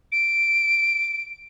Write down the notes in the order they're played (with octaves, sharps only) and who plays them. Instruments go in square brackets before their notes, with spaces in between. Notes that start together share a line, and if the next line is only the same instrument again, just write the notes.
[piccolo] D7